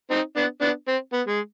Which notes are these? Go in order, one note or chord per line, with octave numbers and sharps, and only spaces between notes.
C4 D#4
B3 D4
B3 D4
C4
B3
G#3